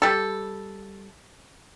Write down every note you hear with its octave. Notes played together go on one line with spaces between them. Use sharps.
G3 A4